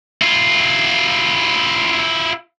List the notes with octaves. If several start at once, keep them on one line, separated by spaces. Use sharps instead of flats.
E4 F4